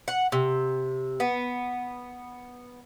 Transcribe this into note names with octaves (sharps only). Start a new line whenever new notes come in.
F#5
C3
B3